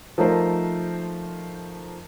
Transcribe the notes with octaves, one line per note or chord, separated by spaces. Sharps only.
F3 A3 D#4 A#4 C5